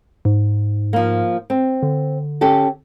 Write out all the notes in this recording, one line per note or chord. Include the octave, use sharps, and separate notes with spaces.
G#2
F3 A#3
C4
D3
C#4 G4 A4